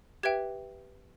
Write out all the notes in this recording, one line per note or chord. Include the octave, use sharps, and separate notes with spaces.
G4 B4 E5 G5 G#6